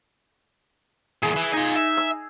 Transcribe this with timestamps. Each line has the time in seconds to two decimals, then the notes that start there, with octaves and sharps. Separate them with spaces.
1.23 E2 A#2 G#4
1.36 E3
1.53 D#4 F4 G#5
1.76 E5
1.97 E6